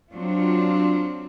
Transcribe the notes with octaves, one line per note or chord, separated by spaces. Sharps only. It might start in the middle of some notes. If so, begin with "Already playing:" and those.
F#3 C4 D4 F4